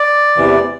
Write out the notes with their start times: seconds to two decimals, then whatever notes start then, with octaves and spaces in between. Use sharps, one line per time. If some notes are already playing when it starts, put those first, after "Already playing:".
Already playing: D5
0.37 E2 C3 E3